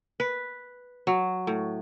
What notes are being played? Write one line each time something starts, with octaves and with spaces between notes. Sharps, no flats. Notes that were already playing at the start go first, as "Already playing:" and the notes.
B4
F#3
A2